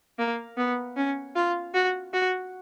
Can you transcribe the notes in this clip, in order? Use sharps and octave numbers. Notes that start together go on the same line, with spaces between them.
A#3
B3
C#4
F4
F#4
F#4